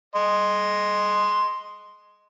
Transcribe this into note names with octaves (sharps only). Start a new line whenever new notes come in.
D#5 C6